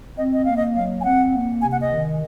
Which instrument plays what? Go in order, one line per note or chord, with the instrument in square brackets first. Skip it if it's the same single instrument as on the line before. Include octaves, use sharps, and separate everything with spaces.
[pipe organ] C4 [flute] D#5
[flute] D#5
[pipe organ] A#3 [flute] F5
[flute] D#5
[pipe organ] F#3 [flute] F5
[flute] G#5
[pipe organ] C4 [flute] F#5
[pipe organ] A#3
[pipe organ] C3 [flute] G#5
[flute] F#5
D#5
[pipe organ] D#3